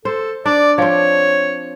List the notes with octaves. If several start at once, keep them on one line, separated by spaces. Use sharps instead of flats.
A4 C5
D4 D5
F3 C4 C#5